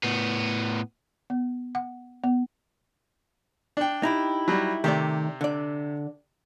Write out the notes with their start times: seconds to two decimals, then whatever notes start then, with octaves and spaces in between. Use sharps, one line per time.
0.03 A2 B3
1.30 B3
1.75 F#5
2.24 B3
3.77 D4 G5
4.03 D#4 E4 G4
4.48 F#3 G3
4.84 C3 D#3 A3 G4 D5
5.41 D3 D5